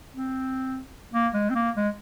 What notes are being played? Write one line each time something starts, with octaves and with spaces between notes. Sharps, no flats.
C4
A#3
G#3
C4
A#3
G#3